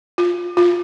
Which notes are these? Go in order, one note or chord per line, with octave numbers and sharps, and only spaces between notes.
F4
F4